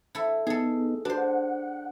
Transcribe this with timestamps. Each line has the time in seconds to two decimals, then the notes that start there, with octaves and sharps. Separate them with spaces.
0.15 E4 A4
0.47 B3 D#4 G#4 A4
1.05 D4 F#4 B4 C5
1.18 F#5